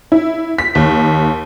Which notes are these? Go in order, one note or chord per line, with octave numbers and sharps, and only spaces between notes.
E4
B6
D#2